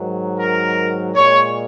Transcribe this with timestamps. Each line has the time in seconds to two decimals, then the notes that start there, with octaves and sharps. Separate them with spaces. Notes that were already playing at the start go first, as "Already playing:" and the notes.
Already playing: G#2 D#3 F#3
0.39 A#4
1.14 A#2 G#3 C#5